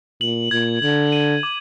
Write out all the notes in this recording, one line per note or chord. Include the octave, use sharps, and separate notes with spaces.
A#2 F#7
A#2 G#6
D3 F#7
D#7
D6